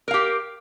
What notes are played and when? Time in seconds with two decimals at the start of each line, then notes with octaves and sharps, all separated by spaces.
0.08 A#4
0.11 F5
0.14 G4